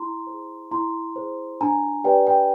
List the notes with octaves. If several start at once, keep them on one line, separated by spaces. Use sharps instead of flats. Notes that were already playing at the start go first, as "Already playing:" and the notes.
Already playing: E4 A#5 C6
G#4 C5
E4 A#5 C6
G#4 C5
D4 G#5 A#5
G4 B4 D5 G5
G5